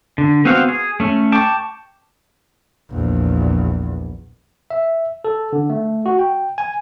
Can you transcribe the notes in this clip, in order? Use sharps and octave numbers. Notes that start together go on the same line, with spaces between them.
D3
B3 C4 F#4 C5 F5
G#4
A3 C#4
G5 A5 C#6 D6
A#1 E2
E5
A4
D3
A3
F#4
G5
G#5